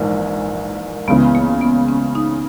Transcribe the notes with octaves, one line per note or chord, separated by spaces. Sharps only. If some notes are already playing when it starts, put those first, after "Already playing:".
Already playing: A#1 G#2 E3 A#3 D#4
C#2 C#3 E3 B3
A#3
B3
C#4
D#4